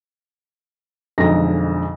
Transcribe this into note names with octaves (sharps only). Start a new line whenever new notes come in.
B1 F2 D3 G#3 A#5 A#6